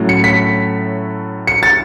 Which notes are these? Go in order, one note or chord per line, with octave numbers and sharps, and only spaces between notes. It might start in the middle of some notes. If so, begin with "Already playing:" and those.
Already playing: A2 F#3 A3 C#4
C#7
B6
C#7
A6